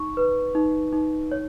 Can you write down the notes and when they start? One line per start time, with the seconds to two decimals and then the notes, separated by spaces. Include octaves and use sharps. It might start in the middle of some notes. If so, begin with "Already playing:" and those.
Already playing: D#4 C#6
0.17 B4
0.55 D#4
0.93 D#4
1.31 C#5